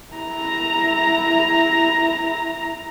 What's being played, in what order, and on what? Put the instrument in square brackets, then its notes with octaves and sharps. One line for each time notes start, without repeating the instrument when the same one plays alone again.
[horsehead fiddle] E4 A#5